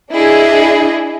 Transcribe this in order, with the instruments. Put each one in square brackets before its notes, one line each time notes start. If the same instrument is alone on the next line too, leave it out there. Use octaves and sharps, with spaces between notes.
[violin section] D4 E4 G#4 D#5